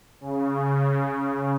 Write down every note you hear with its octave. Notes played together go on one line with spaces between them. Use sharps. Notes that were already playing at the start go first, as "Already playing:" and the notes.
C#3